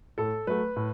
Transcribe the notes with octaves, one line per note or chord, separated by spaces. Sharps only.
A2 A4
F#3 A3 B4
A2